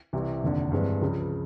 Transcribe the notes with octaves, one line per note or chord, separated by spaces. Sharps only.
C2 C3 E3
F1 D#2 D3
G2 E3 G#3 C4
C#2 C#3 F3